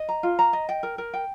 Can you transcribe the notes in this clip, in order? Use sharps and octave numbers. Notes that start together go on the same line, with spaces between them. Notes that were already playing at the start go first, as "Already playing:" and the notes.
Already playing: D#5
A#5
F4
A#5
D#5
G5
A#4
A#4
G5